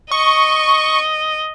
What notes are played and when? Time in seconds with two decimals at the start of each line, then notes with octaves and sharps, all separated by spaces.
0.11 D#5 C#6